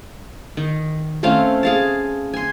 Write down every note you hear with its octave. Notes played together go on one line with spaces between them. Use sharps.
D#3
A3 C4 C#4 F5
G#4 F5 A5
G#5 C6